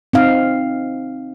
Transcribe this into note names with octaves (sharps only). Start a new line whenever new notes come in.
C4 D#4 F5